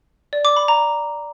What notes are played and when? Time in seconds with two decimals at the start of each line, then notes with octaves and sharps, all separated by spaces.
0.33 D5
0.45 D6
0.56 B5
0.68 A#5